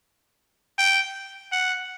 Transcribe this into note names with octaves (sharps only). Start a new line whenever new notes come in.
G5
F#5